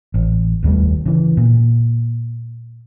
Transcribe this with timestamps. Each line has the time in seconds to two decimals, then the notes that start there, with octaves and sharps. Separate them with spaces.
0.14 A1
0.63 F1 D#2 G3 A3
1.05 C#3 E3
1.37 A#2